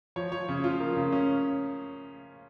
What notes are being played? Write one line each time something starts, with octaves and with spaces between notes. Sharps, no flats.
F3 C#5
F3 C#5
C#3
F3 F4
A#3
C#3
C#4